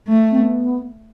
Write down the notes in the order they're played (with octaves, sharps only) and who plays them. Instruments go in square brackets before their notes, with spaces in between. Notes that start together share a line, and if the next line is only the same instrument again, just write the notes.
[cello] A3
[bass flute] C4
B3